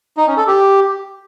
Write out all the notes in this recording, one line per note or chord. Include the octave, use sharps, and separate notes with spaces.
D#4
C#4
A4
G4